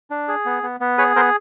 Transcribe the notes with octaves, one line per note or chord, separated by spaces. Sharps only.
D4
G#4
B3
B3
B3
G#4 B4 C#5
B3 A#4 C5